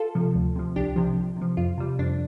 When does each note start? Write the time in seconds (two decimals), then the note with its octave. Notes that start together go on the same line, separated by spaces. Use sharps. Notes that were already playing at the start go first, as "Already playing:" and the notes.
Already playing: F4 A4
0.15 C3 F3
0.35 D2
0.56 C3 F3
0.76 C2 D4 G4
0.96 C3 F3
1.17 C2
1.37 C3 F3
1.57 F2 F4
1.78 C3 G3
1.99 F2 D4